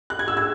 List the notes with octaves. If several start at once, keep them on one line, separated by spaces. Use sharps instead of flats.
F#6
G#6
E6
G#6